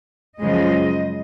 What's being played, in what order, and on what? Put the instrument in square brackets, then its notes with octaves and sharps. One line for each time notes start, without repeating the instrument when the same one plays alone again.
[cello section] F#2 C#3 F3 G#3 D#5